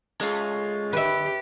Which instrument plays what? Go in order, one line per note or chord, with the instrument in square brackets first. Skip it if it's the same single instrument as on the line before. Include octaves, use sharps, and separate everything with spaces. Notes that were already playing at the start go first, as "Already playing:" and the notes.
[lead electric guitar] G#3 F4 [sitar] A3 C#4 G#4
[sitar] D3 [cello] G4 [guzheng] B4 E5